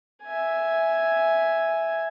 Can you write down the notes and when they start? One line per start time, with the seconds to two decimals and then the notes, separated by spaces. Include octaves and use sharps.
0.23 E5 G#5